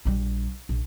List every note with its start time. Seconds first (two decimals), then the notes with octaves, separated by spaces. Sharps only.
0.05 A#1 G3
0.69 A#1